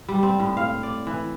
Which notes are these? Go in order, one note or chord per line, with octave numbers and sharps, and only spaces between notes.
G3
C4
A2
F5
D5
E3